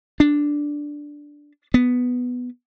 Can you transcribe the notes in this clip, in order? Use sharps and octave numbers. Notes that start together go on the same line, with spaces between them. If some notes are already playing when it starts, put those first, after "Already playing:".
D4
B3